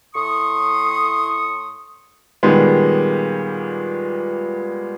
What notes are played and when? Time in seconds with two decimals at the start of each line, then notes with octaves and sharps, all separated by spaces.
0.15 A2 C6 C#6 D#6
2.43 A#2 D#3 G3 G#3 B3